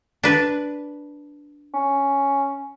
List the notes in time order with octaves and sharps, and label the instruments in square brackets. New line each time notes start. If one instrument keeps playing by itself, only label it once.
[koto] D4 B4
[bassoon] C#4